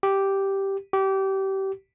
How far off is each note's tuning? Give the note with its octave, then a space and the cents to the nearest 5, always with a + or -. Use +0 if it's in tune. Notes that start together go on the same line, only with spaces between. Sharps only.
G4 -5
G4 -25